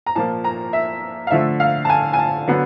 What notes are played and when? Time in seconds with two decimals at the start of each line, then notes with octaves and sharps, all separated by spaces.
0.06 A#5
0.15 A#2 F3 A#3 A5
0.44 A#5
0.73 E5
1.27 F5
1.31 D3 F3 A3 E5
1.60 F5
1.85 A5
1.89 G#5
2.13 G#5
2.19 A5
2.47 D3 F#3 B3